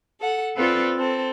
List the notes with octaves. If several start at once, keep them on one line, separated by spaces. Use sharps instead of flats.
A4 F#5
C4 F4 A4 B4 C5 D5
C4 A4